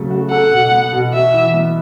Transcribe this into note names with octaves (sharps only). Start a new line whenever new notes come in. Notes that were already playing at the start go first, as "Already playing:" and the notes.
Already playing: C#3 F#3 A3
F#4
A4 F#5
B2
B3
B2
F#4 E5
E3
B3